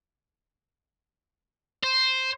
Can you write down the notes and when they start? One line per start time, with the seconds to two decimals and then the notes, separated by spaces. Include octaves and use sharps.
1.84 C5